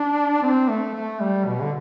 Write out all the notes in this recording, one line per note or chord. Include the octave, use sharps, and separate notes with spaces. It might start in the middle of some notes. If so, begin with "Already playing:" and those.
Already playing: D4
C4
A3
A3
G3
B2
D3